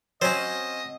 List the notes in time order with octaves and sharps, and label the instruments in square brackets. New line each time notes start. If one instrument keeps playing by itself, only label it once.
[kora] F#3 C4 [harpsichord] C#4 C5 [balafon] C#5 [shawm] D#5